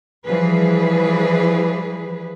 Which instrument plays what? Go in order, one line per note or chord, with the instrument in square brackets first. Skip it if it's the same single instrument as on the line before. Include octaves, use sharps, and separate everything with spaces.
[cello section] E3 F3 G3 G#4 B4